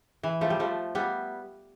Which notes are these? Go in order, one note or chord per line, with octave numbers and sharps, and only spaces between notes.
E3
F3 A3
G3
F3 A3
G3 B3